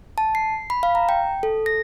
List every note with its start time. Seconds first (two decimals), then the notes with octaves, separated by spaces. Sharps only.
0.18 A5
0.35 C7
0.70 B5
0.83 F5
0.95 A#5
1.09 G5
1.43 A4
1.66 A#6